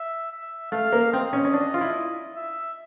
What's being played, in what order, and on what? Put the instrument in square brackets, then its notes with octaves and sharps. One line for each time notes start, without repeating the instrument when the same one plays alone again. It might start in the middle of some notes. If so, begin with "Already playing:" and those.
Already playing: [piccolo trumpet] E5
E5
[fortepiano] A3 [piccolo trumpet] F5
[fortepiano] A#3
[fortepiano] C4 [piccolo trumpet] D#5
[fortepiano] C#4
C#4
D4
F4
E4
[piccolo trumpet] E5